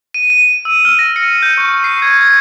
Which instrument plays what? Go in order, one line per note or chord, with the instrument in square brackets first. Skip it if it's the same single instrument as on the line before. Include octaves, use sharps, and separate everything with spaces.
[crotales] D#7
D#7
E6
F6
A#6
C#7
G6
C#6
C7
G#6
G#6